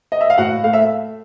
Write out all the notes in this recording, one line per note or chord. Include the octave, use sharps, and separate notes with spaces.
D#5
E5
F5
A2 F#4 F#5
A3 F5
E5